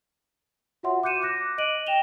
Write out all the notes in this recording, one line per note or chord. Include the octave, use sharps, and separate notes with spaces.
F4 F#4 C#5 E5 F#5 C6
D6 F#6 G6 C#7 D#7 E7
D6 F#6 A#6
D#5 D7 D#7 F#7
G5 A#6 E7 F7 G7